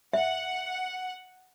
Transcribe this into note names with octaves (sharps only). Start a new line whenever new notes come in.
E5 F#5